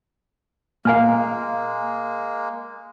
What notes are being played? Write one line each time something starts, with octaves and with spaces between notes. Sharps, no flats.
A#2 G#3 A#3 A#4 F5 G#5 F6